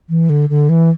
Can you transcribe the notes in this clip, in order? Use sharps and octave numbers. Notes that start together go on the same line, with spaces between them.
E3
D3
D3
E3